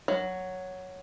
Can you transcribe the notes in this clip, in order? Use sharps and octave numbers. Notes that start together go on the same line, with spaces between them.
F#3